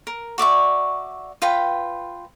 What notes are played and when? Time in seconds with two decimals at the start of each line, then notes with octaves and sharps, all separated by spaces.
0.07 A#4
0.38 F#4 D5 E5 C#6
1.42 F4 B4 G5 B5